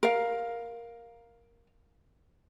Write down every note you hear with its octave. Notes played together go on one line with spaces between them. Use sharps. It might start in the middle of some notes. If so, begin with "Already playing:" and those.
A#4 F5